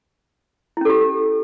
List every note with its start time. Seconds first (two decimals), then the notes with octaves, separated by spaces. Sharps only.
0.77 E4
0.81 C#4
0.85 A4
0.90 G4